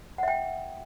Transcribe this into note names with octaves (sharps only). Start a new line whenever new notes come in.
E5 F#5 G5